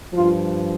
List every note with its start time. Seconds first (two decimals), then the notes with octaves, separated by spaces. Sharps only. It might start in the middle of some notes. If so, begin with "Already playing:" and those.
0.14 G2 F3 F4